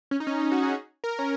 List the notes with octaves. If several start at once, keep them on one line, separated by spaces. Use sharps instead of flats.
C#4
D#4
C#4
D#4
F#4
G#4
A#4
C#4